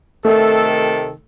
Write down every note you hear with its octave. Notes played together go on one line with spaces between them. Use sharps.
C3 D#3 A3 A4